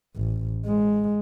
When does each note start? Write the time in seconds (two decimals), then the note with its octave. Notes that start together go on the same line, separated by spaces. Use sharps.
0.17 A1
0.66 G#3